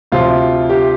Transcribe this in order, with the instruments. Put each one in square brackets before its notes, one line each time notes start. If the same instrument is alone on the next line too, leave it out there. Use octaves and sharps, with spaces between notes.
[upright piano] D2 C3 F3 F4
G4